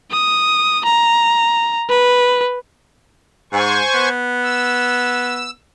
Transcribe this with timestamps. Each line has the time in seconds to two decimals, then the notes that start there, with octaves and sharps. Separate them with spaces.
0.11 D#6
0.85 A#5
1.90 B4
3.53 G#2 C5 G#5 C#6
3.93 B3
4.42 E6